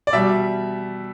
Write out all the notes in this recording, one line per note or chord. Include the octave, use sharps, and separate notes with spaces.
D5
B2 G3 E5